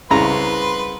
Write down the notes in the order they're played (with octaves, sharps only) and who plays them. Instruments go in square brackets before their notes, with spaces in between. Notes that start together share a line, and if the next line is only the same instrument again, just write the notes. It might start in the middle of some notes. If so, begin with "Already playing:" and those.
[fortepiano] C2 C#3 A#5 [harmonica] B4 C6